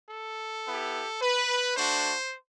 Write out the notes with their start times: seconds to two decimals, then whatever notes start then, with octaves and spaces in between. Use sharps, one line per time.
0.10 A4
0.65 B3 E4 G4
1.22 B4
1.77 A3 D4 F#4 C5